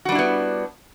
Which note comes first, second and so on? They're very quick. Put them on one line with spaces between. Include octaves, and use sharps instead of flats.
F#4 G3 D4 E4 B3